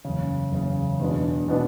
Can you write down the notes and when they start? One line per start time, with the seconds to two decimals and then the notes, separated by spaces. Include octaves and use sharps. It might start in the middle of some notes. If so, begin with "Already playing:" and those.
0.05 F#1 E2 C#3
0.52 F#1 E2 C#3
0.99 E2 B2 G#3 B3 D4
1.48 B2 G#3 B3 D4